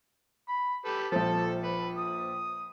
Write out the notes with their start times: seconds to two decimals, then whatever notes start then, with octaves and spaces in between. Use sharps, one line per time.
0.49 B5
0.85 G4 A4 B4
1.12 A#1 F3 A4 A5
1.64 B4
1.98 D#6